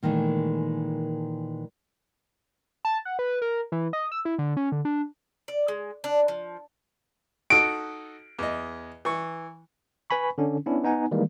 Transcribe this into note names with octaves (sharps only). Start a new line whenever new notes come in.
A#2 D#3 E3 G#3 A3
A5
F#5
B4
A#4
E3
D#5
E6
E4
D3
C#4
D3
D4
D5
G#3
D4
F3
D#4 F#4 A4 D7
E2 D#5
E3 C#6
B4 G#5 B5 C#6
D3 C#4 D4
B3 C#4 D4 E4
B3 D#4 F#5 G#5
D#3 E3 G3 G#3 A#3